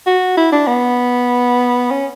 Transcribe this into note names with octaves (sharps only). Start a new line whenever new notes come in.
F#4
E4
D4
B3
C#4